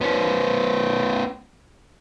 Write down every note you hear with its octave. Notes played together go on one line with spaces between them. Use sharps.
B3 C#4